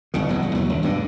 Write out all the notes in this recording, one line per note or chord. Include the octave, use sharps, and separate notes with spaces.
G1 C2 C#3
E2 B2 F#3
B1
D#2 F#3
C#2
G2 B2 D3